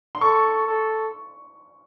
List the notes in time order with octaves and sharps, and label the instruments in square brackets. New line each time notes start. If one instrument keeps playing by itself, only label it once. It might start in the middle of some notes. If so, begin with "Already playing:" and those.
[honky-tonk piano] C6
[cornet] A4 [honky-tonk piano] C#6
[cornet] A4